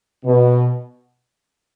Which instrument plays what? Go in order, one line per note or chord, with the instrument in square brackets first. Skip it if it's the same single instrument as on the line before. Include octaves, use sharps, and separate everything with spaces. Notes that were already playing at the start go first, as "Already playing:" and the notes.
[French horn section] B2